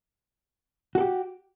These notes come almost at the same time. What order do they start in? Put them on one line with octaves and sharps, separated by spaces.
F#4 A4 G4